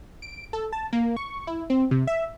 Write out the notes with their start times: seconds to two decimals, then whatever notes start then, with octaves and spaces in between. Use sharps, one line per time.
0.22 D7
0.53 A4
0.72 A5
0.93 A#3
1.17 C#6
1.47 E4
1.70 C4
1.91 C3
2.07 E5